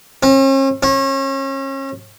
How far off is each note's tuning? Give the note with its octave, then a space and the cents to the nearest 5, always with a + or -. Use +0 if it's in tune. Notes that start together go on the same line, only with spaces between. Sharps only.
C#4 -45
C#4 -35